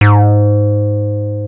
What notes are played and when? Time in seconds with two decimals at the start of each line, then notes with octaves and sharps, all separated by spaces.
0.01 G#2